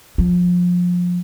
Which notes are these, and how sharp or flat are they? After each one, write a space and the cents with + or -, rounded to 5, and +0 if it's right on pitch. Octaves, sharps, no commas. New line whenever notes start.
F3 +25